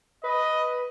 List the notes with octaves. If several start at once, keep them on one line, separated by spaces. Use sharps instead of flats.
B4 D#5